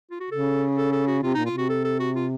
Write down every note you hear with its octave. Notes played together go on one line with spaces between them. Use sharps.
F4
F#4
C#3 A4
A4
A4
F#4
C3 F4
A#2 D#4
F4
C3
F#4
A4
A4
F#4
F4